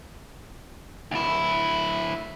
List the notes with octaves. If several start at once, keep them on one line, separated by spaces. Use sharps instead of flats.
D2 E4